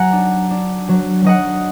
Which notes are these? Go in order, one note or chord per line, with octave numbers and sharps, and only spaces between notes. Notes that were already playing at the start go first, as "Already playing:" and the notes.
Already playing: F#3 F#5 G#5 A#5
D4
D4
F#3
F#3 D#5 F#5